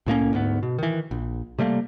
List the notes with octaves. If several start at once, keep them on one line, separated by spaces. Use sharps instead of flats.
C2 A2 A#3 C#4
D2 G#2 B3
B2
D#3 E3
A#1
C3 G3 A3 A#3